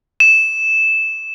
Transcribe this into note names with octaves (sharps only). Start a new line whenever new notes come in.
E7